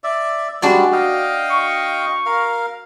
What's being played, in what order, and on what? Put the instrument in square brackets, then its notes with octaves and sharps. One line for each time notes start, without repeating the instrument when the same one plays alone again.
[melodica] D5 E5
[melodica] G3 G#3 [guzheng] D4 F#4 D5
[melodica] D#5 F5 G5
[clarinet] C#6
[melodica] A#4 F5